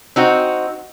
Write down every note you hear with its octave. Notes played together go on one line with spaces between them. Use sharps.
C4 D#4 F#4